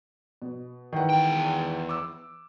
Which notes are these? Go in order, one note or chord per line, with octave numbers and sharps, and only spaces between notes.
B2
D#3 E3 F#5
E2 G5
D6 E6